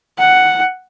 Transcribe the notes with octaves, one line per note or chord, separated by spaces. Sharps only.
F#5